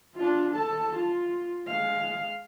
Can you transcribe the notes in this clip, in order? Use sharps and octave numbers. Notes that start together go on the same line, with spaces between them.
D4 F4
A4 A5
F4
G#3 F5